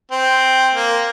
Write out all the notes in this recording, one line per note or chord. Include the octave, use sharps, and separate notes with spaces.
C4
A#3